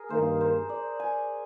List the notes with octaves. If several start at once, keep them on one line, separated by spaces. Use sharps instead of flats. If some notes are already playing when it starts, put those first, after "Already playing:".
Already playing: G#4 A#4
G2 D#3 A#3 C5
C5
D5
G#5